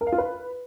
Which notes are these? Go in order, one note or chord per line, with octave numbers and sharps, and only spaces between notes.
A#4
F5
F4
B4